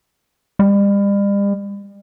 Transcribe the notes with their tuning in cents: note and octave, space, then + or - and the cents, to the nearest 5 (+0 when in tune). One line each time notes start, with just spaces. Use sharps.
G3 +40